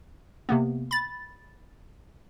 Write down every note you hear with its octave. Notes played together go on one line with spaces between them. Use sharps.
C3 A#3 B3
B5 A6